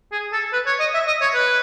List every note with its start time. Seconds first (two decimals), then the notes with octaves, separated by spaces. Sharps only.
0.12 G#4
0.32 A4
0.53 B4
0.66 C#5
0.80 D#5
0.94 E5
1.07 D#5
1.21 C#5
1.34 B4